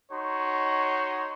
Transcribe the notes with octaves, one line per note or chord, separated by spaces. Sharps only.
D#4 F#4 C#5 C6